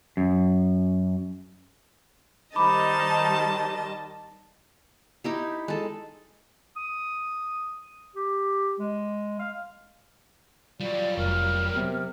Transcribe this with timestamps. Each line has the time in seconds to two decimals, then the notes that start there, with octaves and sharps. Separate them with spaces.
0.17 F#2
2.56 D#3 G3 D#4 C5 D#5 A5 B5 D6
5.24 D#4 E4 G4
5.68 G#3 A4
6.76 D#6
8.15 G4
8.79 G#3
9.39 F5
10.80 F#3 G3 F4 D5
11.17 F1 A#4
11.76 C3 B3